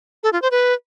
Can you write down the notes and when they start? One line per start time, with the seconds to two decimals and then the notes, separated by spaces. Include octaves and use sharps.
0.23 A4
0.33 F4
0.42 C5
0.51 B4